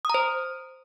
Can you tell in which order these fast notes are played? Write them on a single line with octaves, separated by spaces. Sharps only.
D#6 A#5 C5